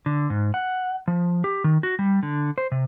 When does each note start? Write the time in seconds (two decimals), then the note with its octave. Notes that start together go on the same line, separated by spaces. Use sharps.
0.06 D3
0.30 G#2
0.54 F#5
1.08 F3
1.44 G4
1.64 D#3
1.83 F#4
1.99 G3
2.23 D3
2.58 C5
2.72 C3